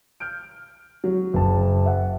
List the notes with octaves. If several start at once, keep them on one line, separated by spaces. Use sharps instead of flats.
F6 G6 D7
F#3
F#1 A5
E5 F#5